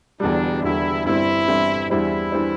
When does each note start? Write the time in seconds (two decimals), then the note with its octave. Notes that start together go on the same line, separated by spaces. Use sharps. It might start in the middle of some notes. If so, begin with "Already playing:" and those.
0.20 E1 E2 D3 G3 D4
0.63 E1 E2 D3 G3 E4
1.05 G1 G2 E3 G3 C4 E4
1.47 G1 G2 E3 G3 C4
1.90 E2 E3 G3 D4 E4 C5
2.32 E3 G3 D4 C5